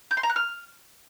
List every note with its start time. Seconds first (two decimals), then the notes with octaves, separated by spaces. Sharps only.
0.11 G6
0.17 C6
0.23 A#5
0.30 F#6
0.36 F6